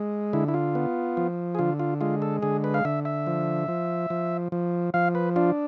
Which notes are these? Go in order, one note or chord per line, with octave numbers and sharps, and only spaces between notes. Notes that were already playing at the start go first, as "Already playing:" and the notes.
Already playing: G#3
D3 E4
E4
F4
B3
F3
G#4
D3 F4
F4
G#3 F4
A4
D3 G#4
B4
F5
D3 E5
E5
F3
F3
F3
F3
F3 F5
B4
D4 F4